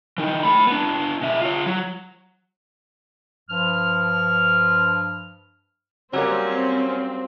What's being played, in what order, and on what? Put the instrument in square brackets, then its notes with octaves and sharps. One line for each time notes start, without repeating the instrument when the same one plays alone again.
[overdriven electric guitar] E3 D#4
A3 B5
B3 D4
B2 E5
F4 C#5
F#3
[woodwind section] G2 F3 F6
[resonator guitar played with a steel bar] F#3 G3 A#3 [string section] C4 [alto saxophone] C#4